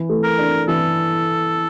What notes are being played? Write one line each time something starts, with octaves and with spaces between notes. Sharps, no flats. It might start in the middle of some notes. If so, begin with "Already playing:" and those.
Already playing: E3
A3
A#4
D4
E3 A4